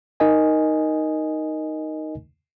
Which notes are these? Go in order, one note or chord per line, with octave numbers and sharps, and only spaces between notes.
D#4 A#4 D#5 G#5